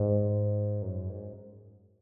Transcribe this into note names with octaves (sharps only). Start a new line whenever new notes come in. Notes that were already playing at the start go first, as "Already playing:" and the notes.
Already playing: G#2
F#2
G#2